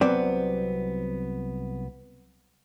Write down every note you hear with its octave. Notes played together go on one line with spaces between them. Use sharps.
C2 F#3 B3 C4 D5